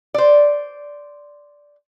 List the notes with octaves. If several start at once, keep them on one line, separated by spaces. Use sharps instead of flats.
C5 D5